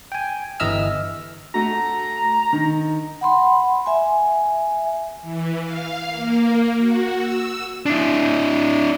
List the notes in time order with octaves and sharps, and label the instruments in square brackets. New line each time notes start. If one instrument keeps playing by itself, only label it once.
[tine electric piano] G5 G#5
G1 E3 D#5 E5 E6 F6
[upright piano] A3 F#4 [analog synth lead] A#5
[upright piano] D#3
[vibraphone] F#5 B5 C6
E5 G#5
[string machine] E3
F5
A#3
F#4
E6
[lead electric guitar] D4 E4